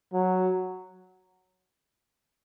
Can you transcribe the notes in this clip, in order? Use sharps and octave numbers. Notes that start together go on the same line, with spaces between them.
F#3